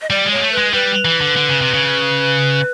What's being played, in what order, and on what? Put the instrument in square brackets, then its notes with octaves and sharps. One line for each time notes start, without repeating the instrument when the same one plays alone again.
[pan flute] D#5
[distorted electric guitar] G3 [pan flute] D5
[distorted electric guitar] G#3
[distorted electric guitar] A#3 [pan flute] C#5
[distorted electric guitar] A3
[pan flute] B4
[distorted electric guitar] G#3
[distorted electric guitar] G3 [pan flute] B4
[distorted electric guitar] E3
D3
D3
C#3
C3
C#3